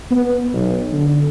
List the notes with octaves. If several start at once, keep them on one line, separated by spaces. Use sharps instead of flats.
B3
B1
D3